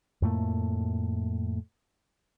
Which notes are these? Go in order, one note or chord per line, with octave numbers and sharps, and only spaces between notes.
F2 A2 A3 A#3